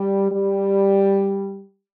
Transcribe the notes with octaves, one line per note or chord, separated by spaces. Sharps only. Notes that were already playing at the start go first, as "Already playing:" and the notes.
Already playing: G3
G3